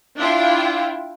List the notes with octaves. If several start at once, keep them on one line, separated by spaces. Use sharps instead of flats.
D4 E4 F4 G5